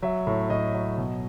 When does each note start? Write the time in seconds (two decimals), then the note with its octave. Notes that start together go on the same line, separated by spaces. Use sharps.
0.02 F#3 E5
0.27 A2
0.50 A2 D#5
0.74 F#3
0.98 B2